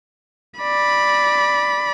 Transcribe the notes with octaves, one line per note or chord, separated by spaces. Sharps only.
D5 B5